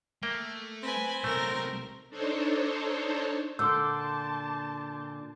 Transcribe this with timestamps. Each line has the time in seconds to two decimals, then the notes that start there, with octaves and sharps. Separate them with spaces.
0.23 A3 A#3 G5
0.83 C4 B4 G#5
1.24 B1 C3 A3 A#4
2.10 D4 D#4 A4 C5 C#5
3.59 A#2 D3 A5 C6 D6 E6 G6